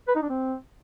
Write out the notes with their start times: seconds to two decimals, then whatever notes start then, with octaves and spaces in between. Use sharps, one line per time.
0.08 B4
0.15 D#4
0.22 D4
0.29 C4